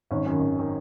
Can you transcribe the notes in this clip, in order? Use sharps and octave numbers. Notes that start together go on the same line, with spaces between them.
G#1 C#4
F#2 D#3 C#4
G#1
D#3